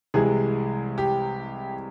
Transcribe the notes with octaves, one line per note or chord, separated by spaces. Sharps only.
C2 C3 E3 G#3 G#4
G4